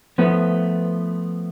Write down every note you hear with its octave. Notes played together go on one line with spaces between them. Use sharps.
F3 A3 B3 B4